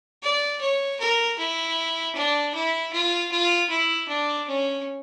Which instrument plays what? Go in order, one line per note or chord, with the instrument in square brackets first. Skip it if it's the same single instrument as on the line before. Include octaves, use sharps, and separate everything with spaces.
[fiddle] D5
C#5
A#4
E4
D4
E4
F4
F4
E4
D4
C#4